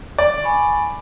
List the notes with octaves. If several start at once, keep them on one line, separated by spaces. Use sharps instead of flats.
D5
G#5 B5 C#6